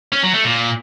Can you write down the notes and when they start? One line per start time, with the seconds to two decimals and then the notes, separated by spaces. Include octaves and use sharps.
0.13 C#4
0.23 F#3
0.34 A3
0.44 A#2